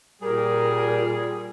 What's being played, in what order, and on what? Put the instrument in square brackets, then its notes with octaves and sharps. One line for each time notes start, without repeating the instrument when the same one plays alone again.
[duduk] A#2 [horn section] G3 G#4 [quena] A#4